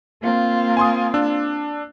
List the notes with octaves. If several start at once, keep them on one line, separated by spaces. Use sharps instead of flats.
A#3 C4 F4
G#5 C6 D#6
D4 E6